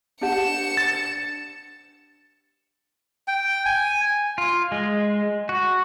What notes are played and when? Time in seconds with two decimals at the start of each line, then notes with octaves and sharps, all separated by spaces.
0.21 D4 G4 F#5 C#7 E7
0.77 A6
3.28 G5
3.66 G#5
4.38 F4
4.72 G#3
5.49 F#4